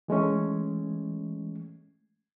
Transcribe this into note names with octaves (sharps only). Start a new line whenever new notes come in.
E3 G#3 A3 C#4